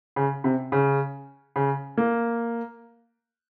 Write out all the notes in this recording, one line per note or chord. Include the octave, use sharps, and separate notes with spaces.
C#3
C3
C#3
C#3
A#3